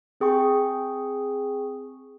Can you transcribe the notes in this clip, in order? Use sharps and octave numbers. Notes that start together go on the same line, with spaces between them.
C4 G#4 G5 C#6